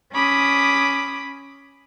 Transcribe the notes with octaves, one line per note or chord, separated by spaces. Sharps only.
C#4 B5 D6 D#6